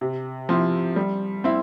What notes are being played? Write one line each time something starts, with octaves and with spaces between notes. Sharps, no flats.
C3
F3 C4 E4
G3
C4 E4